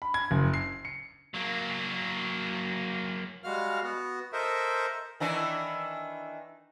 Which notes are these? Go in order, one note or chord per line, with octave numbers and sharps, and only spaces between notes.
B5
G#6
F#1
C7
C#7
F#3 A#3
G3 G#3 F#4 F5 F6
B3 F#4
A4 A#4 C5 D#5 E5
D#3 E3 D4